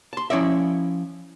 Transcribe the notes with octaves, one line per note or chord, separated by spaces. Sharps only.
A5 C6
F3 C#4 E4 C#5 D5 E5